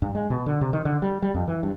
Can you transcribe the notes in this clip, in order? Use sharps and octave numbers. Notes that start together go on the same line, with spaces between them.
G2
G#3
B2
D3
C3
D#3
D3
G3
G3
F2
E3
G2